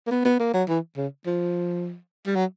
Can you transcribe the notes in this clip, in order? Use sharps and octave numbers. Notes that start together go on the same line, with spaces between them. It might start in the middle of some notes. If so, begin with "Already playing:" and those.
A#3
B3
B3
A#3
F#3
E3
C#3
F3
G3
F#3